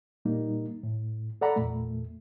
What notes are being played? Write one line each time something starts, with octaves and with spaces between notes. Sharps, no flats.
A#2 G3 A#3 D#4
A2
A4 D5 F#5 A#5 B5
E2 A#2 A3